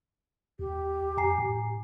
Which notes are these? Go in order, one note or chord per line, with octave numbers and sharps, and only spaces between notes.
D#2 G4
F2 G#5 A#5 C7
A2